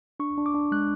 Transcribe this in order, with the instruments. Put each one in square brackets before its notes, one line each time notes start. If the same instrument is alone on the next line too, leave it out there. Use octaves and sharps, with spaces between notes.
[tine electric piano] D4 C#6
D4
D6
D4
G#3 F#6